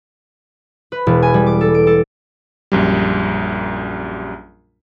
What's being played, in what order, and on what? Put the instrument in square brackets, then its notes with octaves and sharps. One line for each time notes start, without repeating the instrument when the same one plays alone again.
[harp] B4
E1
G#5
G3
D6
A4
D7
A4
[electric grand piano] A#1 F#2 G3